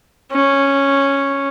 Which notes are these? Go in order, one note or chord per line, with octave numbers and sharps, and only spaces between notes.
C#4